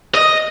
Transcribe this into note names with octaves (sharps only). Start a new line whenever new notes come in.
D#5